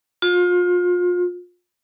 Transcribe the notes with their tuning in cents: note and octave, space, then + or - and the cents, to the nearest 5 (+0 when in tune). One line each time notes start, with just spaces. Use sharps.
F4 +30